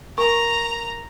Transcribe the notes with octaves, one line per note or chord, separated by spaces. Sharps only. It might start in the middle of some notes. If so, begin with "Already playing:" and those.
A#4 A#5 C#6